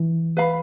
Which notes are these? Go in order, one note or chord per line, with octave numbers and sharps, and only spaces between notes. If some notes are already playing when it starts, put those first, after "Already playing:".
Already playing: E3
B4 F5 B5